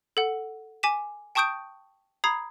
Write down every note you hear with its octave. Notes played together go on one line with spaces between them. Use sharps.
A4 F#5
G#5 D6 B6 E7
G5 A5 C#6 D#6 G6 D7
A#5 B5 D#6 G#6 C7